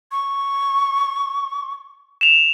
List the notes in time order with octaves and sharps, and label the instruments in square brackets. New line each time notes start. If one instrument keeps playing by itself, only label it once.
[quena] C#6
[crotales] E7 F7